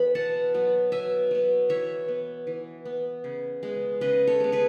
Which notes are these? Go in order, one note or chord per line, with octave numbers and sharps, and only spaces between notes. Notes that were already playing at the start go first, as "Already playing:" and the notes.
Already playing: E3 B3 B5
B2 F#5 A5
F#3 B3
B2 E5 G#5
F#3 B3
E3 C#5 E5
B3
E3
B3
C#3
G#3 B3
C#3 B4 D#5
A4 C#5
G#3 B3
G#4 B4